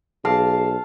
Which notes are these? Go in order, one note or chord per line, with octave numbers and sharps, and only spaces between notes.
B1 G#4 F5 A5